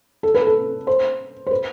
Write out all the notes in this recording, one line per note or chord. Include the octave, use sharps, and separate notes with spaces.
A4
B4
A4
C5
C5
B4